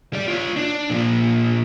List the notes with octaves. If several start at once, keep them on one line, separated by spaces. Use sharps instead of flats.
G3 D5
F4 C#5
D4
A#2 F3